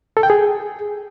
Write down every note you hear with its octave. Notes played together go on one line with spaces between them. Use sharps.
A4
G5
G#4